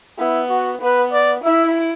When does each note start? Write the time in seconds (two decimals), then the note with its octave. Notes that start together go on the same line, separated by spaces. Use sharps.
0.18 B3 E4
0.50 F#4
0.81 B3 B4
1.12 D5
1.44 E4 E5